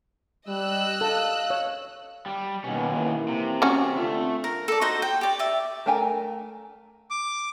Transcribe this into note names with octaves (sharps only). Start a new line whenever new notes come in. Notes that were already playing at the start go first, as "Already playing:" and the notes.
G3 D#5 E6 F#6
A4 F5
C#5
G3
D#2 B2 C#4
E3 A#3
C3
C#4 F#4
D3 A3 C4 F4
A#4
A4 D5
D#4 F#4 C5
G5
G4 D5
D5 E5
A3 A#4 G5 G#5 A#5
D6